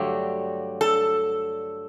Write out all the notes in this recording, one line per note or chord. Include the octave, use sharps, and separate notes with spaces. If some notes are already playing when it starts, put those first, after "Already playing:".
Already playing: G2 D3 F#3 A3 G4
A4